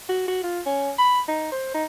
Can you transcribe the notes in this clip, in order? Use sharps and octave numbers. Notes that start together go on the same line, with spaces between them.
F#4
F#4
F4
C#4
B5
D#4
C5
D#4